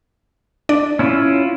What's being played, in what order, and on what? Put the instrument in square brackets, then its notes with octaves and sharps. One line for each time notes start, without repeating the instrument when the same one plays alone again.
[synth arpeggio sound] D4 D5
[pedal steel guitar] C#4 E4 F4